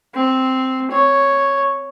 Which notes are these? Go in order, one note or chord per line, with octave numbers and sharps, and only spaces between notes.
C4
C#5